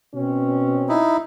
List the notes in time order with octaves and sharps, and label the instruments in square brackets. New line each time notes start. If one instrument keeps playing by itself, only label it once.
[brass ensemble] B2 C4 C#4
[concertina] D#4 E4